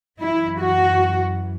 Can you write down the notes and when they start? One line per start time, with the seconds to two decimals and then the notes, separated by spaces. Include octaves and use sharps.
0.19 F#2 E3 E4
0.60 F#4